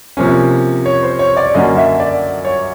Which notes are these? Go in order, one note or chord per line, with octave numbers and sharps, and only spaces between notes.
C3 F3 A#3 C#4
C#5
C5
C#5
D5
F#2 D3 F#3 A#3 C#4 D#5
E5
D5
C#5